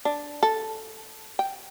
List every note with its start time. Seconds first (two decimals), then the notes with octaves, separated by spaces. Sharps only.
0.05 D4
0.43 A4
1.39 G5